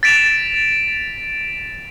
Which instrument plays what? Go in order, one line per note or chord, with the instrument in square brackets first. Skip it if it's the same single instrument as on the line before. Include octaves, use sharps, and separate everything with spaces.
[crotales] A6 B6 D7 E7 F7